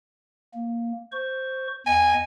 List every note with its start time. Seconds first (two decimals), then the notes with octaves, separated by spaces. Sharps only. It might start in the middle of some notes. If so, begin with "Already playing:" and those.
0.54 A#3
1.12 C5 C#6
1.87 E2 D#5 G#5